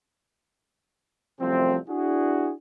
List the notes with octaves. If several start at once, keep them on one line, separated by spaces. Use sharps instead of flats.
C2 F#2 F3 A3 C4
D4 E4 F#4 G#4